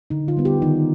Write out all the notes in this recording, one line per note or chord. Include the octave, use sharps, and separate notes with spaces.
D3 D#4
F4
G3 B3
G4
D#3 D#4